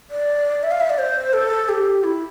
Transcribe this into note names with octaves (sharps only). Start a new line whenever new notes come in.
D5
E5
F5
E5
D5
C5
A4
G4
E4